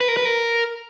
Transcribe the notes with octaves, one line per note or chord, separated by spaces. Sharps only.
B4
A#4
B4
A#4